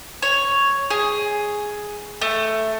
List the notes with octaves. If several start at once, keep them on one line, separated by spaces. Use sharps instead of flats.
C#5
G#4
A3